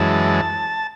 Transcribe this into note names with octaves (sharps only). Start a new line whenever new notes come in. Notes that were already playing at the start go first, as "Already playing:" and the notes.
Already playing: F#2 E3 G#3 A5